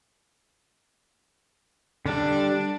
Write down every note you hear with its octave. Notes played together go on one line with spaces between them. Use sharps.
D3 G3 D4